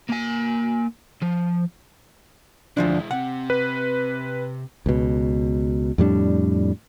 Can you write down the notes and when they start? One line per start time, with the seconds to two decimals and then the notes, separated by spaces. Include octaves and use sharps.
0.10 A#3 G#5
1.22 F3
2.77 D2 E3 F3 G#3 D4 E4
3.11 C3 C4 F#5
3.50 B4
4.86 C#2 B2
5.98 F2 A2 G3 D4